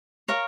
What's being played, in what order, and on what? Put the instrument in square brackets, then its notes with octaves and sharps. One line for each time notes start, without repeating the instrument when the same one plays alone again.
[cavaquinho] A#4 C#5 F5 A#5